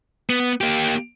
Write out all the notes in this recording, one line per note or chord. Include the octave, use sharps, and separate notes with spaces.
B3
A#3 G4